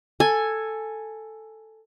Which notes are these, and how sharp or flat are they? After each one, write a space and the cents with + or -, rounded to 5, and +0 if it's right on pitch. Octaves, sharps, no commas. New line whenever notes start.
A4 +5 G#5 +0